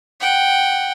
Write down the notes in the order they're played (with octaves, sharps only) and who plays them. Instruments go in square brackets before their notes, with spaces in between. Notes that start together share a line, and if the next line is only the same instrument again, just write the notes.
[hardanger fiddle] F#5 G5